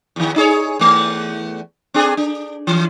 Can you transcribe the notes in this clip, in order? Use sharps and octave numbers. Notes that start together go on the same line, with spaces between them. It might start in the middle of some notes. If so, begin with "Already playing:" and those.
E2 D#3
D#4 G#4 C#5
E2 A3
C4 D4 G#4
D4
E3